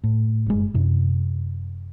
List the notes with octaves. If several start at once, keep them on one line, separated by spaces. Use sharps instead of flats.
A2
F#1 G2 G#3
F#2 C3